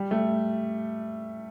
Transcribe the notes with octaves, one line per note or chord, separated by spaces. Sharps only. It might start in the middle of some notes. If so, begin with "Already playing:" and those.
Already playing: G3
A3